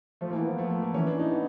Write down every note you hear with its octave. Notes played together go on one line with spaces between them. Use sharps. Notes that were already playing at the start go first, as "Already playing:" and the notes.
F3 A3
A#3
E3
B3
F3
A3
A3
A#3
E3 C#4
D4
D#4
B3